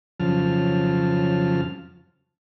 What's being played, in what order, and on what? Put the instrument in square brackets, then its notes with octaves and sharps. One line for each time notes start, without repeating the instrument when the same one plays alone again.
[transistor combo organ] F2 C#3 F3 F#3 A5 F6